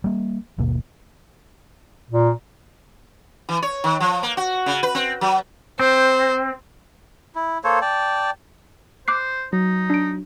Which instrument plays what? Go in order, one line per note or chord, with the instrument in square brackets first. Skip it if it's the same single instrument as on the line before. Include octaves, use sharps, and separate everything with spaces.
[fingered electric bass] G3 A#3
G#1 D#2 B2 A#3
[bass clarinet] A#2
[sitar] E3
C#5
D#3
F3
A#3
F#4
C#3
B4
C4
F#3
[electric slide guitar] C4 [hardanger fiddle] C5
[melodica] E4
A#3 A4 C5 C#5
D5 G5 A5
[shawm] C5 [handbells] D6 F#6 C7
[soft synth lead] F#3 [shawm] D#4
[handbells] D4 D7